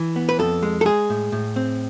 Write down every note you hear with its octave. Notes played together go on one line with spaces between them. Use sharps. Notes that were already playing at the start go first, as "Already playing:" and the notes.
Already playing: E3
B3
B4
F2 A4
G#3
A4
G#3 G#4
A2
A2
C4